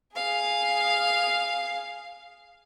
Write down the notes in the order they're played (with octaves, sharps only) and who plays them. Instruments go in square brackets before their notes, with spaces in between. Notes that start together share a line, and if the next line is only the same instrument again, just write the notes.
[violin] G#4 F5